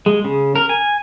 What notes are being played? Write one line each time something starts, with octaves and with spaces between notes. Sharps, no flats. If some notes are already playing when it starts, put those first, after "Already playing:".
G#3
C#3
A#4
G#5